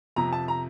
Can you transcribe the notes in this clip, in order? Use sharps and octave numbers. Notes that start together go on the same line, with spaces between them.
F2 C3 F3 A#5
A5
A#5